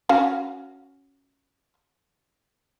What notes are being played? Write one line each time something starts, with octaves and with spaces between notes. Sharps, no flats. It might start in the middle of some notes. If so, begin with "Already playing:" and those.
C#4 F#4 F5